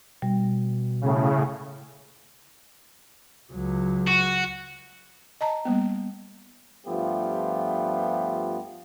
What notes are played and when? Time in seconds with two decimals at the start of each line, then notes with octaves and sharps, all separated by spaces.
0.22 B2 G3
1.01 A2 C#3
3.52 C#2 F#3
4.07 F#4
5.41 D#5 A5 A#5
5.65 G3 A#3 B3
6.87 G2 F3 A3 B3 F4 G4